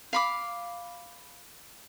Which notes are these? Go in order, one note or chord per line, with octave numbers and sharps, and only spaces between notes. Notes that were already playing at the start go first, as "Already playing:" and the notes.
F5 B5 D6